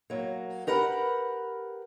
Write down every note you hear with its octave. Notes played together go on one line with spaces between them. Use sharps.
F#3 A#3
G4 A#4 B4 F#5